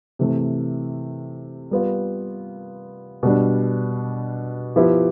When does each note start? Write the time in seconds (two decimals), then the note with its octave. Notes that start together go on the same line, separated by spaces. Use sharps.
0.19 C3 E3 A3
1.71 G3 B3 F4
3.23 B2 G3 D4
4.76 F3 B3 E4 G4